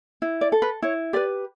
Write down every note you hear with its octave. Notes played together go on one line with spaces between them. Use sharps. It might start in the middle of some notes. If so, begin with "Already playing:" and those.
E4
D5
A4
B4
E4 C#5
G4 B4 D5